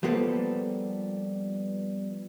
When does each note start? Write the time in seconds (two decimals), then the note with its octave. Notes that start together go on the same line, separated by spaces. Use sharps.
0.03 F3 G3 A#3 B3 A4 B4